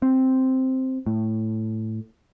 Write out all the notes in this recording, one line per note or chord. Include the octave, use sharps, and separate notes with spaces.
C4
A2